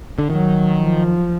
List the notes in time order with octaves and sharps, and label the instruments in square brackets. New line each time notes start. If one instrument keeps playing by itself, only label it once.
[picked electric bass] D3
[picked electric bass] D#3 [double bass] F#3
[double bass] F3